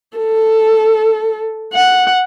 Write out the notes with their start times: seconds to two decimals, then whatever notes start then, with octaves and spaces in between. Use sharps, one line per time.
0.18 A4
1.73 F#5